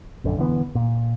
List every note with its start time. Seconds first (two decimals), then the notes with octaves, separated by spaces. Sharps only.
0.24 A#1 F#2 D3
0.37 E1 D3 E3 B3
0.75 A#2